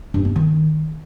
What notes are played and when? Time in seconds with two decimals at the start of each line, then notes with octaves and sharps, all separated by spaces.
0.14 G2
0.25 B3
0.36 D#3